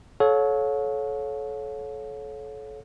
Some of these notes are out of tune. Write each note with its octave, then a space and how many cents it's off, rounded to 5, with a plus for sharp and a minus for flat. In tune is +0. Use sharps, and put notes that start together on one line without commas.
A4 -30 C#5 +0 F5 +40